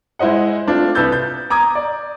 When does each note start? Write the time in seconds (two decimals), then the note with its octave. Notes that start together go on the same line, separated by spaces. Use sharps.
0.19 G#3 E4 C5 D#5 F#5
0.67 A3 C4 D4 F4
0.95 C2 B4 E6 G6 A6
1.12 G6
1.50 A#5 D6 D#6 G#6
1.75 D5